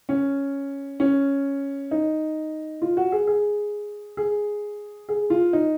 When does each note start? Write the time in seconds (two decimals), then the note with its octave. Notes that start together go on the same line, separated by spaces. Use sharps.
0.09 C#4
1.00 C#4
1.91 D#4
2.82 F4
2.97 F#4
3.12 G#4
3.27 G#4
4.17 G#4
5.09 G#4
5.30 F4
5.53 D#4